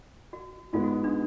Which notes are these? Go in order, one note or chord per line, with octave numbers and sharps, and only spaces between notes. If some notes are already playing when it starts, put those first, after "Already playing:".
F#4
G#2 G#3 B3 F4
F#4
D4